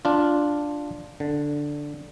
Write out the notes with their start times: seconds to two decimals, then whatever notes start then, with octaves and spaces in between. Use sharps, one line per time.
0.05 D4 F4
1.20 D3